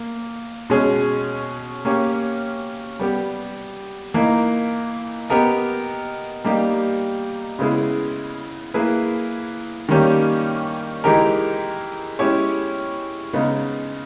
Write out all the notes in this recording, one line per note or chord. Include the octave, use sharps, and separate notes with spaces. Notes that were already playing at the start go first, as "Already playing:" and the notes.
Already playing: A#3
B2 G#3 C#4 G#4
A#3 C#4 G4 C#5
G3 B3 G4
E3 A#3 D#4 A#4
B3 G4 A#4 D#5
G3 A#3 D#4 G4
C#3 G#3 B3 E4 G#4
A#3 E4 G#4 B4
D#3 G3 A#3 C#4 G4
E3 G#3 D#4 G4 A#4
G#3 C#4 E4 G4 C#5
C#3 G#3 B3 D#4